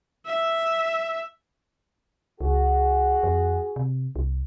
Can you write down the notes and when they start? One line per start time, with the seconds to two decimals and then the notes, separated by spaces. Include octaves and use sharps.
0.26 E5
2.41 C#2 F#4 G#4
3.23 F2
3.76 C3
4.16 C2